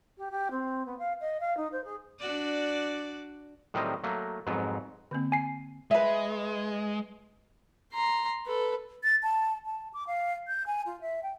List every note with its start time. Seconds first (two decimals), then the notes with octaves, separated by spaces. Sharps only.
0.18 G4
0.31 G4
0.51 C4
0.86 B3
0.98 F5
1.20 D#5
1.40 F5
1.57 D#4
1.72 C5
1.84 G#4
2.19 D4 F#4 D5
3.74 A2 D#3 F#3 G3 C4 D#5
4.04 F#3 A3 A#3
4.47 F2 G#2 F#3 B3
5.11 D3 A#3 C4
5.32 G#5 C7
5.91 G#3 B4 E5
7.93 A#5 C6
8.46 A4 B4
9.04 A6
9.23 A5
9.66 A5
9.94 D6
10.07 F5
10.48 G6
10.67 G#5
10.86 F4
11.01 E5
11.23 G5